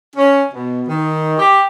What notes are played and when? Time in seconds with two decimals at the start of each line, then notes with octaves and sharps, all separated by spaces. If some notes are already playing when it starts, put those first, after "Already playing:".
0.16 C#4
0.52 B2
0.88 D#3
1.38 G4